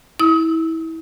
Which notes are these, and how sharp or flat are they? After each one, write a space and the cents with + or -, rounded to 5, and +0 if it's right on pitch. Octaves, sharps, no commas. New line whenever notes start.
E4 -25 D#6 +40